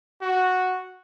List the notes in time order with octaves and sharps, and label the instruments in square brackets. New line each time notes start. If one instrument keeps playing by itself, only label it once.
[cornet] F#4